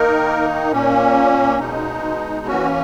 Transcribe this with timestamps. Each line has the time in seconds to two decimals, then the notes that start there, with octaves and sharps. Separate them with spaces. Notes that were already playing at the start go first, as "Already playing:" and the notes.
Already playing: D#3 A#3 D#4 A#4
0.72 A#2 A#3 C#4
1.60 B2 G#3 D#4
2.47 E3 A#3 C#4 F#4